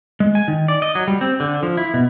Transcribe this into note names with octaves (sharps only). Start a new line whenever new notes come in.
G#3
G#5
D#3
D5
D#5
F#3
G3
C4
D3
F3
E4
B2